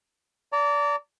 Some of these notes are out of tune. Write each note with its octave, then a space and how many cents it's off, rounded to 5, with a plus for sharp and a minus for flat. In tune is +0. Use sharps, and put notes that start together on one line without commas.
D5 -25 A#5 -40